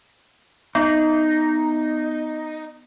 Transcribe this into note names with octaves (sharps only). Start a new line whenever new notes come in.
B3 D#4